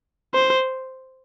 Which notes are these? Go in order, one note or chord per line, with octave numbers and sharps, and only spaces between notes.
C5